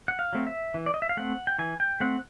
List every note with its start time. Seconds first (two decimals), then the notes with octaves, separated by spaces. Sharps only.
0.08 F#5
0.19 F5
0.33 F#3 A3 C4
0.47 E5
0.74 E3
0.86 D5
0.94 D#5
1.02 E5
1.09 F5
1.17 A3 C4 F#5
1.47 G5
1.59 E3 G#5
1.80 G5
2.00 A3 C4 F#5